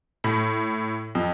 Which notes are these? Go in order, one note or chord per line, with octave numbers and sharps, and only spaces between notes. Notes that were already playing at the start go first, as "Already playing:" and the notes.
A2
F2